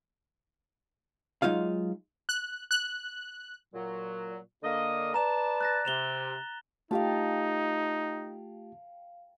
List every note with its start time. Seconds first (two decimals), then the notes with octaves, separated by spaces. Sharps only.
1.42 F#3 G#3 D#4 F4 F5
2.29 F#6
2.71 F#6
3.73 A#2 F#3
4.63 D3 A#3 D#5
5.14 B4 D5 A5 A#5 E7
5.61 F#6 A6 A#6
5.85 C3 E7 F7 G7
6.91 A3 D#4 F4 G4 F5 G5 A5